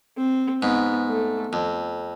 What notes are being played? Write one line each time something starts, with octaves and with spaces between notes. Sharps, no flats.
C4
G#2 B3
A3
F2